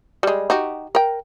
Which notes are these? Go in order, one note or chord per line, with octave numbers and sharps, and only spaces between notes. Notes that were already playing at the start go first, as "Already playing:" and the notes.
G3 G#3
D#4 F#4 G4
A#4 G5